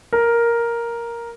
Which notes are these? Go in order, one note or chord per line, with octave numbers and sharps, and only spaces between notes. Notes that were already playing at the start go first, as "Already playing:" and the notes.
A#4